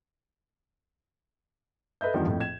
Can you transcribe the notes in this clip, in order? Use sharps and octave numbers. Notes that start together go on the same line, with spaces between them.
A4 B4 D#5 E5 G6
E2 G2 D#3 F3 G3
A#1 F2 A2
G#6 E7